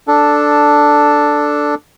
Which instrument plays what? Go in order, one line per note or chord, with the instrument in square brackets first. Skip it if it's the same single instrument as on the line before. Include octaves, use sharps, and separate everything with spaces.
[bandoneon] D4 A4